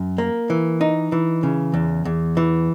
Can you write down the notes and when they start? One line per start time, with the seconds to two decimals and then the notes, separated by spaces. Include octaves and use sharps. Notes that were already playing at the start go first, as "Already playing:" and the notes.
Already playing: F#2
0.18 A#3
0.50 E3
0.81 D#4
1.12 E3
1.43 C#3
1.74 E2
2.05 E2
2.37 E3